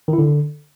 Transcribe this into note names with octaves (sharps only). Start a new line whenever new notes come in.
D#3
E4
D3